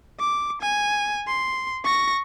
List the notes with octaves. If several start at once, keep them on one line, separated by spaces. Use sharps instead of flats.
D6
G#5
C6
C#6 A#6